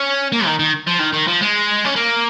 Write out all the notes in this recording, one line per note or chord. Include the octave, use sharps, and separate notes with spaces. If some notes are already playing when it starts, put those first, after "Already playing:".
Already playing: C#4
A#3
D#3
D#3
F3
D#3
D#3
F3
G#3
C#4
A#3